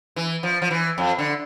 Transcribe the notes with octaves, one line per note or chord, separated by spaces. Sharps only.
E3
F3
F3
E3
F2
D3